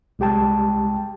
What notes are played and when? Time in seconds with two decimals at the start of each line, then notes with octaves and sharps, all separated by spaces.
0.19 C2 G#3 G4 G5 A5